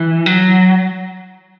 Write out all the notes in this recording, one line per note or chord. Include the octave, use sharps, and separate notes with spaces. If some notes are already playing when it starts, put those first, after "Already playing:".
Already playing: E3
F#3